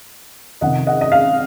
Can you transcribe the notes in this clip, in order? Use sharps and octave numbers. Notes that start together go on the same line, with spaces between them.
F2 C3 D#3 D#5 F#5
D#5 F#5
D#5
F5